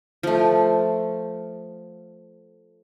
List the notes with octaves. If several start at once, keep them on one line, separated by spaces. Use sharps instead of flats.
F3 A3